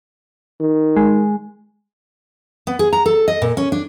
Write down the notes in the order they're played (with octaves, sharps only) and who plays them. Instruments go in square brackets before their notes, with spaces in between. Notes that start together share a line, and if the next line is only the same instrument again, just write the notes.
[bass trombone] D#3
[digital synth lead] G#3
[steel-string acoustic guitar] B3
G#4
A#5
A4
D#5
A#2
C#4
D4